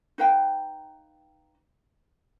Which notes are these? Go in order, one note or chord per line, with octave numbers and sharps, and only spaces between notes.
D#4 B4 F5 G5